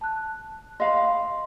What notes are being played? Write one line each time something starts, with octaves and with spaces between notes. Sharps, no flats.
A5 F#6
D#5 F5 B5 C6